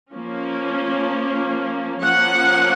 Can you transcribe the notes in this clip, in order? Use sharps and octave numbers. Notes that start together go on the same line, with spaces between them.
F3 A#3 C#4
F3 A#3 C#4 F#5